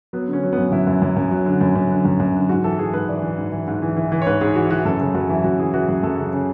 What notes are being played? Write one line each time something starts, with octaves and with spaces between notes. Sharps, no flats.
F#3 B3
D3
C#4
F#3
F#2 B3
F#2 E4
F#2
F#2
F#2
F#3
D3
F#2
F#2
D3
F#2
F#2
D3
G#2 F#4
E3 A4
E3 G#4
G#2 B4
E3 D5
E3
G#2
E3
G#2
E3
E3
E3
C#5
G#2 B4
G#2 G#4
E3 F#4
E3 F#4
F#2 A4
C#3 A4
F#2 F#4
E3 E4
F#2 F#4
E3 G#4
E3 F#4
F#2 G#4
F#2 A4
C#3
C#3